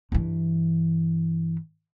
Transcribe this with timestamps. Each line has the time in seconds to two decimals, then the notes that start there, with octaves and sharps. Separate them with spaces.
0.12 G2 E3